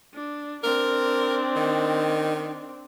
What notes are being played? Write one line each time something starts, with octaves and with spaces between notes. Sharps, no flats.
D4
C4 D4 A#4
D#3